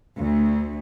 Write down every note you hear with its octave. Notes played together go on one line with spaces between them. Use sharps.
D2